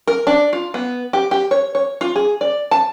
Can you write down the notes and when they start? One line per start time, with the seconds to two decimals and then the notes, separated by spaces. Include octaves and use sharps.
0.07 A#4
0.27 D4
0.53 F4
0.74 B3
1.13 G4
1.31 G4
1.51 C#5
1.75 C#5
2.01 F4
2.16 G#4
2.41 D5
2.71 A5